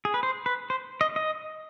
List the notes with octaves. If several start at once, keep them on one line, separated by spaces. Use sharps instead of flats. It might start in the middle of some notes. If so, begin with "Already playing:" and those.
G#4
B4
C5
B4
C5
D#5
D#5